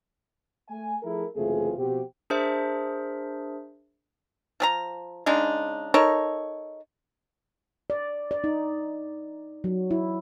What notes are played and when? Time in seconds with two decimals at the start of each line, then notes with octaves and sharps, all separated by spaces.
0.69 A3 G#5
1.03 F3 A3 E4 G#4 A#4
1.36 F#1 C3 E3 A3 F4 G#4
1.78 B2 F3 C4 F#4 G4
2.30 D4 G#4 A#4 C5 E5
4.60 F3 G#4 A#5
5.26 C#3 G#3 D4 D#4
5.94 D#4 A4 A#4 C#5
7.90 D5
8.31 D5
8.44 D#4
9.64 F#3
9.91 E4